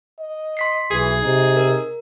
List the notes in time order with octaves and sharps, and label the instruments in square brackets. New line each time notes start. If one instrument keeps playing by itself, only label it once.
[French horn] D#5
[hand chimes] C6 B6 C7
[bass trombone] B1 [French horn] E3 [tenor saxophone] G#4 [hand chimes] C7
[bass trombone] C3 [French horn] D#4
[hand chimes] A#4